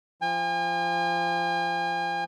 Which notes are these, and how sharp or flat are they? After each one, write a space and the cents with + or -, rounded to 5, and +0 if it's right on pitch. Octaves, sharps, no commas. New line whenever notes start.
F3 -20 G#5 -45